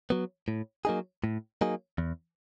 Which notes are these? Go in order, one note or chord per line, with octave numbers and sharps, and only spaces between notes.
F#3 B3
A2
F#3 A#3 D#4 G#4
A2
F#3 A#3 D#4 G#4
E2